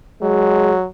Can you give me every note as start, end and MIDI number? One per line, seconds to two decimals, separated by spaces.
0.22 0.85 54
0.22 0.73 56